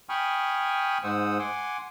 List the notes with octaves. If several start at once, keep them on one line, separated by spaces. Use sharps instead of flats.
G5 G#5 B5 C#6 D#6 F6
G#2 G#3 C5 F#5 D#6 E6
F#5 G#5 C6 D6